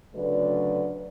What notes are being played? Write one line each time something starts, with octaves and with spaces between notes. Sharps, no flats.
D2 C#3 F#3 A3 B4 D5